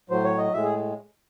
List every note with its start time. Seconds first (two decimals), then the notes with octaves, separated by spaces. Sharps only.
0.10 A2 F#3 C5
0.24 C#5
0.38 D#5
0.52 A2 G#3 E5
0.63 G#4